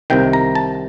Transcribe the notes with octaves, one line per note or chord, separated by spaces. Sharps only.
C2 C3 D#3 G5
A#5
A5